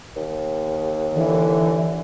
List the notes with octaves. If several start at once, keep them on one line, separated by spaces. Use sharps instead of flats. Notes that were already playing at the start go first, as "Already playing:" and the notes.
D#2
D3 E3